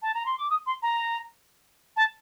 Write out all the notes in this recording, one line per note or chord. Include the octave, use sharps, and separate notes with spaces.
A5
A#5
C6
D6
D#6
C6
A#5
A5